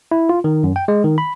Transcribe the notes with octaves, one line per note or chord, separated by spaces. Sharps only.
E4
F4
D#3
F#2
G5
G#3
D#3
B5